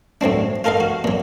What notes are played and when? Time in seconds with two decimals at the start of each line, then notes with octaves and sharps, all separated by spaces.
0.21 A2 F#3 C4 D4
0.64 F4 A4 A#4 D#5 F5
0.80 F#4
1.04 A#2 F#3